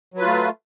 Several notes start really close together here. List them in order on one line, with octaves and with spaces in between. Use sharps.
F#3 B4 F4 A3